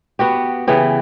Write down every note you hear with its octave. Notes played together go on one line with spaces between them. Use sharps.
B3 F#4 G4
C#3 E3 B3 G4